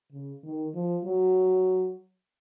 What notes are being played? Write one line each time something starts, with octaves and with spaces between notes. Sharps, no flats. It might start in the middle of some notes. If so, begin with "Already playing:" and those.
C#3
D#3
F3
F#3